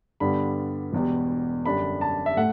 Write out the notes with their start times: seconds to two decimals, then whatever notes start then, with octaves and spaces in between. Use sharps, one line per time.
0.20 G2 D3 G3 B3 B5
0.93 E1 E2 B2 G3
1.65 F#2 D3 G3 D4 B5
2.01 A5
2.26 E5
2.37 A2 A3 F#5